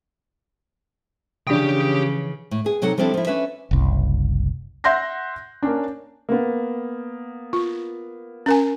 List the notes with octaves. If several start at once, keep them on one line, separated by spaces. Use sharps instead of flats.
C#3 E3 F3 C#4 D4 G4 G5 D#6
A2
B3 G#4
C3 F#3 D#4 A4 F#5
F3 G3 C4 D4 E4 A4
F3 E4
C#4 D4 B4 E5
F#1 C2
E5 F#5 C6 F#6 G6 A#6
A#3 C#4 D4
A#3 B3
F4
C#4 A#4 G#5